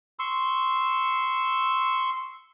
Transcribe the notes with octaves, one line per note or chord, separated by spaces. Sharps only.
C6 C#6 E6